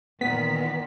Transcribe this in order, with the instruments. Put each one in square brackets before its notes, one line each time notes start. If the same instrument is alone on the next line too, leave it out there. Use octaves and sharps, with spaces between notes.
[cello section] A#2 D#3 E3 [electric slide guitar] B3 [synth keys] B6